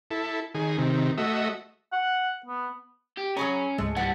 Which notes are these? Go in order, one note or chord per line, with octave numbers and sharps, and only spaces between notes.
E4 A4
D#3 G#4
C3 D#3
A3 F#4 D#5 E5
F#5
B3
G4
F#3 C#4 G#4 C#5 A#5 B5 C#6
C#2 G#2 G#3 A3
E3 G3 F#5 A5